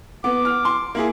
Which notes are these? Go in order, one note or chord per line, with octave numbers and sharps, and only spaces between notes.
B3 D6
F6
C6
A#3 E4 G#4